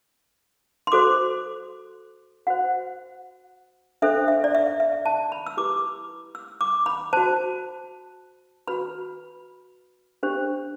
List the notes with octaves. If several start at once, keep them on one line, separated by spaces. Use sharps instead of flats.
C6
F#4 A4 C5 D6
F#4 C5 F#5
D4 A4 C5 E5
E5
D5
E5
E5
A5
B5
E6
E4 G4 B4 D6
E6
D6
B5
F#4 C5 A5
F#4 B4 B5
D4 G4 C5